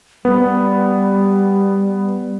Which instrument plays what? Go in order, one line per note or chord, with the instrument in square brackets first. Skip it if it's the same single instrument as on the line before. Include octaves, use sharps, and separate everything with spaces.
[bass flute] G3 [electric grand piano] B3